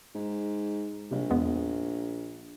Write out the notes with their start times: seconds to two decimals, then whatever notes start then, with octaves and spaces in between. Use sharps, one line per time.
0.15 G#2
1.11 A#1 C3 G3
1.30 E2 G#3 B3